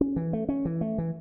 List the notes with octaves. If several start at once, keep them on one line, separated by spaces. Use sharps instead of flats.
C#4
E3
A3
C#4
E3
A3
E3